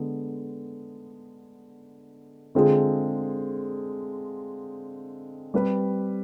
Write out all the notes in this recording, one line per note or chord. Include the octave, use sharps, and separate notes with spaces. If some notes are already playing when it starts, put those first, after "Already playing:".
Already playing: D3 G#3 B3
D3 G#3 C4 F4 G#4
G3 C4 G4 B4